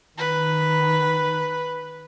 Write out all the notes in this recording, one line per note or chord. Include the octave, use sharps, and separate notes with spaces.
D#3 B4